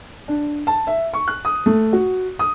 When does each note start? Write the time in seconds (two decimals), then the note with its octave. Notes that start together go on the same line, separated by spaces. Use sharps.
0.28 D4
0.67 A5
0.87 E5
1.14 C#6
1.28 F#6
1.45 D#6
1.66 A3
1.93 F#4
2.39 D#6